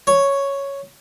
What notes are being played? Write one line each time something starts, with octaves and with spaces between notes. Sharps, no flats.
C#5